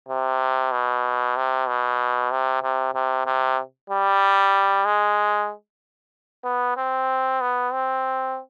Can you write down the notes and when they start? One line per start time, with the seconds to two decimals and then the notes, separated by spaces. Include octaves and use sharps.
0.09 C3
0.72 B2
1.36 C3
1.67 B2
2.31 C3
2.63 C3
2.94 C3
3.26 C3
3.90 G3
4.85 G#3
6.44 B3
6.77 C4
7.41 B3
7.73 C4